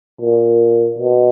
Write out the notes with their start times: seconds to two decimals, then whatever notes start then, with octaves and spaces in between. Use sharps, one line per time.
0.21 A#2
0.98 B2